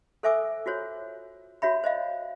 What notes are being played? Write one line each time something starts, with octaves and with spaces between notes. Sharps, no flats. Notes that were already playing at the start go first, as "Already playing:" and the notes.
A4 C5 E5 G#5 D6 E6
F4 F#4 C5 C#5
F#4 C#5 E5 B5
C5 D#5 F5